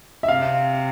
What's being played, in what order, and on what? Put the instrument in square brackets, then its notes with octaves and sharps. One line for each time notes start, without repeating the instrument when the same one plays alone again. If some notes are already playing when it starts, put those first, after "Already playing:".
[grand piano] E5
[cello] C3 [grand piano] F5